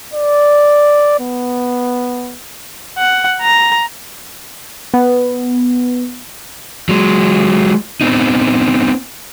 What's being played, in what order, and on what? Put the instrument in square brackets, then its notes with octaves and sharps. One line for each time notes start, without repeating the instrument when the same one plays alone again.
[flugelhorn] D5
B3
[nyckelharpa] F#5
A#5
[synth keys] B3
[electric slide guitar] F#3 G#3
B3 C4 D#4